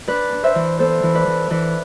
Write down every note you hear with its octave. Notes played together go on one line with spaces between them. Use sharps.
D4 B4 D5
D4
C5 E5
E3
B3 A4 C5
E3
B4 D5
E3
E3 B4 D5